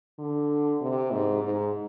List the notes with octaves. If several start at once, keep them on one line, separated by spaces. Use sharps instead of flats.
D3
C3
G#2
G#2